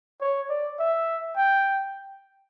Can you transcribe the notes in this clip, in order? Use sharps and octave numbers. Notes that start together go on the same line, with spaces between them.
C#5
D5
E5
G5